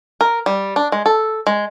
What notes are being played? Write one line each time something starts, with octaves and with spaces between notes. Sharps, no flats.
A#4
G3
D4
G#3
A4
G#3